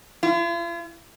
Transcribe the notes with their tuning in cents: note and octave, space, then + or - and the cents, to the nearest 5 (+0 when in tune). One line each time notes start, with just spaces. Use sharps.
F4 -45